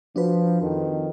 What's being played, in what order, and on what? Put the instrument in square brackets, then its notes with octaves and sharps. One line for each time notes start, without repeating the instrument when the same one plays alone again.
[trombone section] F3 [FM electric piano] D4 F#4 B4
[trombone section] F2 D#3